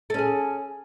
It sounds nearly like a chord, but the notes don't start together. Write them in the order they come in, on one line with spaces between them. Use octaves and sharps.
A4 C#4 G#4